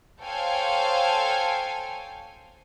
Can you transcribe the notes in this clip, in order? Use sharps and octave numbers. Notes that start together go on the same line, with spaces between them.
A4 C5 C#5 F5 G5 G#5